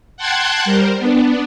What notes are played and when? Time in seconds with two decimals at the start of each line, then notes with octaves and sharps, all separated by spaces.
0.17 F#5 G5 A5 C6 F#6 G#6
0.65 G3 A#4 C5
0.99 B3 D4